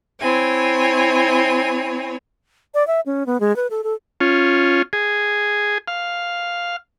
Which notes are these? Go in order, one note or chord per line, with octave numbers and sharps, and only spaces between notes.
C4 E4 C#5 G#5
D5
E5
C#4
B3
G#3
B4
A4
A4
C#4 F4
G#4
F5